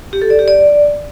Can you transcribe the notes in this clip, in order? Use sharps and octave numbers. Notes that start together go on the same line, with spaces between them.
G4
A4
D5
G4
D5